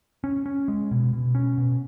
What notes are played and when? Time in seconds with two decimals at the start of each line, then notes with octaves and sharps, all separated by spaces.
0.24 C#4
0.46 C#4
0.68 G#3
0.91 B2
1.13 B2
1.35 C#4
1.58 B2